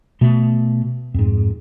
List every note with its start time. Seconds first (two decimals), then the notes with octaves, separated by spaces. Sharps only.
0.21 B2 A3
1.14 F2 G#2